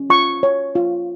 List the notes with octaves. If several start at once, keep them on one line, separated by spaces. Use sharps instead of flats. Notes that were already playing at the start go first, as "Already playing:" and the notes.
Already playing: C#4
F4 C#6
C#5
F4